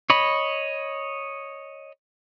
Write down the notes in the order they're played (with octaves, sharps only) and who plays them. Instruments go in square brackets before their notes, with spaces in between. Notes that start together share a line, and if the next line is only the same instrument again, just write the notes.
[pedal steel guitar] C#5 D#5 B5